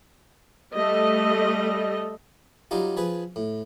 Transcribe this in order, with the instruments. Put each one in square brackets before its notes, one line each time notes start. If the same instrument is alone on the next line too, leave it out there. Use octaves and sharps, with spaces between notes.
[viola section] G3 A3 D#5
[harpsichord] F#3 G3 D#4 F4 G4
F3 G#4 B4
A2